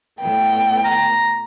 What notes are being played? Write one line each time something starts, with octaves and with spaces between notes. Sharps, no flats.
A2 B3 G5
A#5